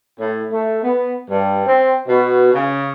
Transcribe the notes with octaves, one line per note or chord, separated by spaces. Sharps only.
A2
A3
B3
G2
C4
B2
C#3